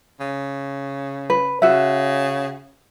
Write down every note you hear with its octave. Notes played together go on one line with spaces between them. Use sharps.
C#3
B4
C#3 F#4 E5